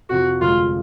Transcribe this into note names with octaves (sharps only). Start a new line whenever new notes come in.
F2 C3 F3 F#4
G1 F2 C3 F3 G#3 F4